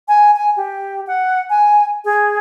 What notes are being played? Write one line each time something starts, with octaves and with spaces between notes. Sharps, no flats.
G#5
G#5
G4
F#5
G#5
G#4